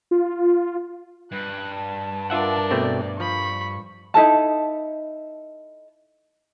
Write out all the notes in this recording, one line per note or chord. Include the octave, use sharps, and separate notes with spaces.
F4
G2 F#6
A5
D4 F4 A#4 E5 F#5
B2 A3 C4 D5
F3 B5 C#6
D#4 E4 A4 A5